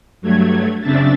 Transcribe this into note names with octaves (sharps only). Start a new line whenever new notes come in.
G2 F#3 A3 G#6
F#2 C#3 C4 D4 E5 A6